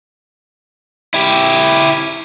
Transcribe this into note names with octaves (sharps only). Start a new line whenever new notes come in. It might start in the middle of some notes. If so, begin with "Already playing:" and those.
E4 G4